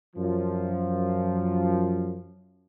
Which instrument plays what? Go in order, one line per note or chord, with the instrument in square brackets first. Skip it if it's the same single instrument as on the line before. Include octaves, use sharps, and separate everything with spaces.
[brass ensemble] F#2 F3